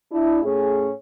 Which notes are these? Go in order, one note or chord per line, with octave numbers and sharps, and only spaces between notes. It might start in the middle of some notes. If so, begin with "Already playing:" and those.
D4 E4
A2 A3 C#4 G#4